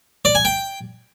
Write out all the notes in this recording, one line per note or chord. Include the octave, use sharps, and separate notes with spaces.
D5
G#5
G5